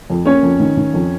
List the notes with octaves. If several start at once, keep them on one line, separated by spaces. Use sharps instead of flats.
F2
A#3 C#4 C#5
F2
D#3
D#3
F2